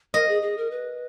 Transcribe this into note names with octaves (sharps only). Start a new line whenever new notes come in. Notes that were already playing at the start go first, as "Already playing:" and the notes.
A#4 D#5
G#4
G#4
A#4
B4